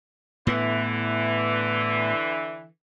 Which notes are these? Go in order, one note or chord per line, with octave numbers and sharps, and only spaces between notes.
A2 D3 E3 B3